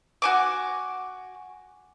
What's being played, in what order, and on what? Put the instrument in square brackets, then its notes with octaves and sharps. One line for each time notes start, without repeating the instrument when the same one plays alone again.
[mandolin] F#4 G#5 D6